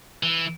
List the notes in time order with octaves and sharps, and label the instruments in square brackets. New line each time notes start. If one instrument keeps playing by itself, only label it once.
[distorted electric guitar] E3